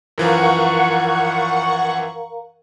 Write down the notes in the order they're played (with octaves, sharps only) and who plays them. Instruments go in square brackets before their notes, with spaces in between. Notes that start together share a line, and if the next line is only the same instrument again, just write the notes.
[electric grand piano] F#2 E3 F3 [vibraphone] A#4 F5 A#5 [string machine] F#5 C#6